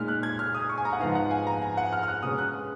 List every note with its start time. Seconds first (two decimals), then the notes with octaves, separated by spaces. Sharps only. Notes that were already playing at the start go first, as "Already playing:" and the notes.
Already playing: A#2 G#3 D#4 F6
0.08 F#6
0.23 G#6
0.39 F6
0.54 D#6
0.69 C#6
0.78 G#5
0.85 A#5
0.93 F#5
1.00 G#2 F3 G#3 B3 D#4 F5
1.15 F#5
1.31 G#5
1.47 A#5
1.62 G#5
1.77 F#5
1.93 F6
2.03 F6
2.08 F#6
2.23 B2 G#3 C#4 D#6
2.38 F#6